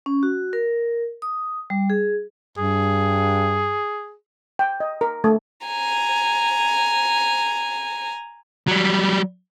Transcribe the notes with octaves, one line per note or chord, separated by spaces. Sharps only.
C#4
F#4
A#4
D#6
G3
G#4
G2 G#4
G5
D#5
A#4
A3
G#5 A#5
F#3 G3